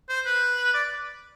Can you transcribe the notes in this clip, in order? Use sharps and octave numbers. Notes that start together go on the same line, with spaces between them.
C5
B4
D5